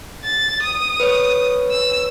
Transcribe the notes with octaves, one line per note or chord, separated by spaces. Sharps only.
A6
D#6
B4 C#5
E6